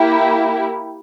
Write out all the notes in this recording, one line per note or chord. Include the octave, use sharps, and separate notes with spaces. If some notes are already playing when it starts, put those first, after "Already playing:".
Already playing: A#3 E4 G4